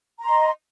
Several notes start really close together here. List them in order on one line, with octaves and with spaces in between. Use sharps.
A#5 C6 D#5